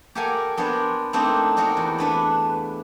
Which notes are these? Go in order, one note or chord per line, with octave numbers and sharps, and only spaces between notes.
G4 A4 A#4 F5 F#5 G#5
B3 D4 A#4 C5 C#5
A3 A#3 C4 D4 D#4
D4 D#4 F#4 A#4
E2
A3 D4 B4